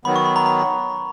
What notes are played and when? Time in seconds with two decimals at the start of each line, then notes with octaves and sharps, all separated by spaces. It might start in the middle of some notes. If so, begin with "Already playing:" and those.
0.05 D#3 F#3 B3 B5
0.16 C#6
0.26 B5
0.36 A#5
0.46 A#5